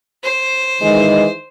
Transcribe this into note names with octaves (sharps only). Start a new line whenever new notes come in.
C5
D#3 E3 G#3